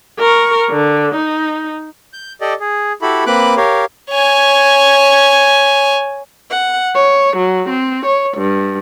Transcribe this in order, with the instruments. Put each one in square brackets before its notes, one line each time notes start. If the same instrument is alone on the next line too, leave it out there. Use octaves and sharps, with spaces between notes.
[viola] A#4 C#6
D3
D#4
[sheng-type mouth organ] G6
G4 A4 D5 D#5
G#4
E4 F#4 G4 A4 B5
A#3 C4 B4 B5 D6 F#6
G4 A#4 C#5 F5
[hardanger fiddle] C#5 G#5
[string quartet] F#5
C#5
F#3
C4
C#5
G2